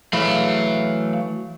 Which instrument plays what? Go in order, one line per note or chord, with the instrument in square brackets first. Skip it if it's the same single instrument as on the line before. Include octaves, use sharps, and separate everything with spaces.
[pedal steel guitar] E3 F#3 A3 [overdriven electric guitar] F5 B5